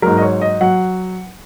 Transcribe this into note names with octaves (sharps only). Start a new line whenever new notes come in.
G#2 F#3 A#4
D#5
C#5
D#5
F#3 F#5